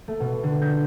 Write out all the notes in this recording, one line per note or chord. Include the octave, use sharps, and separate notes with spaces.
A3
B2
D3
G6